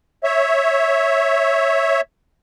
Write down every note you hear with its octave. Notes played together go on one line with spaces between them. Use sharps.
C#5 E5